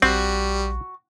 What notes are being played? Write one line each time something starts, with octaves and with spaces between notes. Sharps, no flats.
A#1 G3 C4 F#4